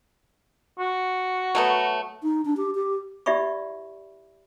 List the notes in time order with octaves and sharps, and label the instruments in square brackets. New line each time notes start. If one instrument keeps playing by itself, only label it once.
[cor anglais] F#4
[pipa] F#3 A3 B3
[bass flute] D#4
D4
G4
G4
[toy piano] E4 G4 D5 E5 B5 C#6